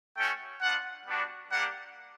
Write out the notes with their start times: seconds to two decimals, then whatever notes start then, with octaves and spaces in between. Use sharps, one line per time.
0.16 A3 C#4 F#4 G5
0.61 B3 D4 F4 F#5
1.07 G3 B3 D4 F#4
1.51 G3 A#3 D4 G4 F#5